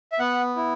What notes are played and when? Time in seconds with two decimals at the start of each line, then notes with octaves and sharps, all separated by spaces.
0.12 E5
0.19 B3 F#5
0.56 E4